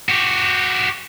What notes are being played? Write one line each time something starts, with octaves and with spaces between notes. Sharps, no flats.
F#4 G4